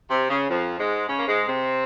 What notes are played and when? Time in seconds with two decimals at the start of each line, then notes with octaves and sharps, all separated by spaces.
0.09 C3
0.29 C#3
0.49 F2 F3
0.78 G#2 G#3
1.07 C#3 C#4
1.17 A#3
1.27 G#2 G#3
1.46 C3 C4